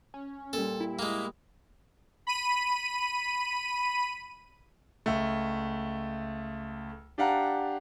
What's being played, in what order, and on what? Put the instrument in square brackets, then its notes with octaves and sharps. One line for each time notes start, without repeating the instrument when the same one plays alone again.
[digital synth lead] C#4
[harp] A#2 G3 [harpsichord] A4
[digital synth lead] E4
[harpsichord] G#3 A#3
[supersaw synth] B5 D#7
[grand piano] C#2 A3
D4 G4 F5 F#5 A5 A#5